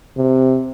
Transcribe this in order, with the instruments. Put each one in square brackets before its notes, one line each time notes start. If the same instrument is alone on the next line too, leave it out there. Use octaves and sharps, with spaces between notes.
[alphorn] C3